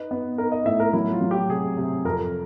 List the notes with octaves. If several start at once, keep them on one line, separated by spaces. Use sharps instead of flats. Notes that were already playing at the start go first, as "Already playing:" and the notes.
Already playing: D#4 B4
B3
D#4 A#4
D#5
A2 E5
A#4
F#3 E4
F4
F#3
G4
C3 G#4
C3
F2 A#4